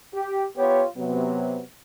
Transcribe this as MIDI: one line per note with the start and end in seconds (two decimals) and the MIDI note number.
0.14 0.44 67
0.57 0.85 59
0.57 0.85 65
0.57 0.85 67
0.57 0.85 73
0.97 1.61 48
0.97 1.61 54
0.97 1.61 59